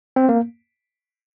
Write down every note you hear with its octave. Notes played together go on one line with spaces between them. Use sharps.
C4
A#3